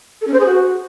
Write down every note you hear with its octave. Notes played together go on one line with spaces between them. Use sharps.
A4
C#4
C5
G#4
F#4